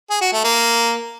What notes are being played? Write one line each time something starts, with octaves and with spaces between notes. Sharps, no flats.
G#4
F#4
A3
A#3